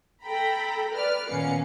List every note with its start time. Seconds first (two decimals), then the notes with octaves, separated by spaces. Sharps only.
0.23 A4 G5 A#5 B5
0.94 B4 D5 F6
1.29 A#2 D#3 B3 C#4 F5 C#7